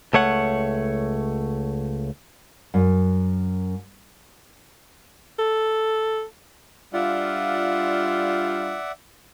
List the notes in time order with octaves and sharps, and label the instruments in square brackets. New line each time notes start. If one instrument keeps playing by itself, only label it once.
[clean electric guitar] C#2 A3 C#5 F#5
[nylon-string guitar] F#2
[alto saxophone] A4
[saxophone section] G3 D4 F4 [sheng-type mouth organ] D5 E5 F#5